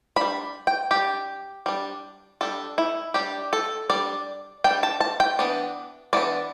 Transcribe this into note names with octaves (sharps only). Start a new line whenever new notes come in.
G3 D4 B5
G5
G3 D4 G4
G3 D4
G3 D4 A4
E4
G3 D4 G4
A4
G3 D4 D5
G3 D4 G5
A5
A5
G5
E3 B3 D4
E3 B3 D4 D5